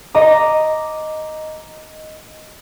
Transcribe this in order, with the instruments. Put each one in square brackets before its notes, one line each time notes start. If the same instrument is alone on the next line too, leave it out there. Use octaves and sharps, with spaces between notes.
[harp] D#5 A#5 D6